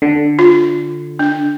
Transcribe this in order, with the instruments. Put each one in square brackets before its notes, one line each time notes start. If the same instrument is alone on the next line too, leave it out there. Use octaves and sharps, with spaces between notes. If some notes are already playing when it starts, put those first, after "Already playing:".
[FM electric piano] D3
[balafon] F4
D4